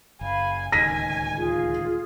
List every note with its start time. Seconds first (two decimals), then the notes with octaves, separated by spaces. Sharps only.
0.21 F#1 F5 G#5 B5
0.72 D1 C#2 D#3 D#5 G#5 A#6 B6 D#7
1.36 F4 G#4